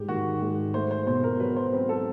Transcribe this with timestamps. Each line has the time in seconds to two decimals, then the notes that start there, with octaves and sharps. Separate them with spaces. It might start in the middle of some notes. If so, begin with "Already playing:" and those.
Already playing: G#2 G3 G4
0.08 D#3 F#4
0.42 G#2
0.74 A3 C5
0.91 C5
1.06 B2 C5
1.24 A#4
1.40 F#3 B4
1.56 C5
1.73 C4 B4
1.89 A4